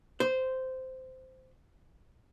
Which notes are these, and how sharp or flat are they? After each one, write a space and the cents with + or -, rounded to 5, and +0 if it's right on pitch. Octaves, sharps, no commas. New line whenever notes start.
C5 -10